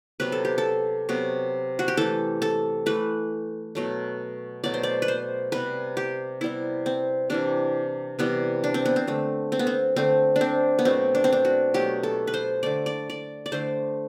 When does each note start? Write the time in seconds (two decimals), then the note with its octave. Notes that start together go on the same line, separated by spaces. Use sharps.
0.20 C3 F#3 B3 B4
0.32 A4
0.45 G4
0.58 A4
1.09 C3 F#3 B3
1.79 F#4
1.88 G4
1.97 E3 A3 A4
2.42 A4
2.86 E3 A3 B4
3.75 B2 F#3 A3
4.64 B2 F#3 A3 D5
4.74 C5
4.83 D5
5.02 B4
5.08 C5
5.52 C3 G3 B3 B4
5.97 G4
6.41 C3 G3 B3 E4
6.86 C4
7.30 C3 E3 G3 D4
8.19 C3 E3 G3 B3
8.64 D4
8.74 C4
8.86 B3
8.96 C4
9.07 D3 A3
9.52 C4
9.59 B3
9.67 C4
9.96 D3 A3 C4
10.36 D4
10.41 C4
10.79 B3
10.85 B2 F#3 A3 C4
11.15 D4
11.24 C4
11.33 D4
11.45 F#4
11.74 B2 F#3 A3 G4
12.03 A4
12.27 B4
12.34 C5
12.63 D3 A3 D5
12.86 D5
13.10 D5
13.46 D5
13.52 D3 A3 C5